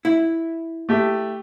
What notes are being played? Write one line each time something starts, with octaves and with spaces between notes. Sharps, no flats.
E4
A3 G4